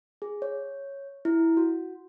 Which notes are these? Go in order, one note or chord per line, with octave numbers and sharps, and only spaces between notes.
G#4
C#5
E4
F#4